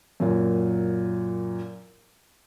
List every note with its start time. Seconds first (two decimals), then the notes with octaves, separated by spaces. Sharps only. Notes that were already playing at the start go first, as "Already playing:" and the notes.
0.20 F#2 A#2